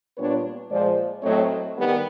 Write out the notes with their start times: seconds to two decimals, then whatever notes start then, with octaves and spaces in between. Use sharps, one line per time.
0.17 A#2 G3 B3 D4 B4 C#5
0.70 A#2 F3 G#3 C5 D5
1.23 A2 F#3 A3 C4 C#5 D#5
1.76 D#3 G3 B3